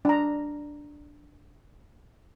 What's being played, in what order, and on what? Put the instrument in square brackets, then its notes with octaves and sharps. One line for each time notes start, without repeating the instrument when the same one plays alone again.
[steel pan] D4 A#5